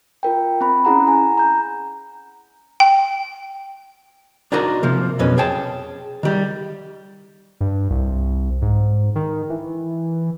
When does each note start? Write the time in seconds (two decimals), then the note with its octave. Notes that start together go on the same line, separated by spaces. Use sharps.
0.23 F4 A#4 G5
0.61 C4 B5
0.85 C#4 E4 G#4 F#5 A#5
1.07 G#5 A#5
1.38 A#5 G6
2.80 G5
4.52 D4 D#4 F#4 A#4 A#5
4.83 C3 F3 A#3
5.19 B1 F2 B2 C#4 B4
5.38 G#4 C#5 G5 A5
6.23 D#3 G3
7.61 G2
7.90 C2
8.62 G#2
9.15 D#3
9.50 E3